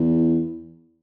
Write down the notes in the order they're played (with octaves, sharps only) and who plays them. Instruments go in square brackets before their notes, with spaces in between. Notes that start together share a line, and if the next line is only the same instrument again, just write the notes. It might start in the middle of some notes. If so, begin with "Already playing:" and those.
Already playing: [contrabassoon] E2